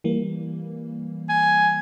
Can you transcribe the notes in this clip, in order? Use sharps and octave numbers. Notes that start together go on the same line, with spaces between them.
E3 G3 A#3
G#5